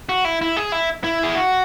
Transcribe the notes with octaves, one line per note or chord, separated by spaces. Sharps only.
F#4
E4
E4
G#4
E4
E4
G#4
F#4